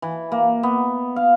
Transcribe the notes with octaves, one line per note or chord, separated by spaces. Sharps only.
E3
A#3
B3
F5